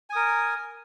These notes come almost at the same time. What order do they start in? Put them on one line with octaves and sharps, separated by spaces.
G#5 D#6 A#4